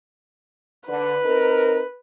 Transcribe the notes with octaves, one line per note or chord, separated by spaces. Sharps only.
D3 B4
C4 D#4 A#4